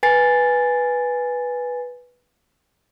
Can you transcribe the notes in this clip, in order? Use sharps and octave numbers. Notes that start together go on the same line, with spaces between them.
B4 G#5 A6 C7